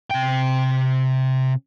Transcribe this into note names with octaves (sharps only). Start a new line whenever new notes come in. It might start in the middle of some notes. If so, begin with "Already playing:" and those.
C3 G5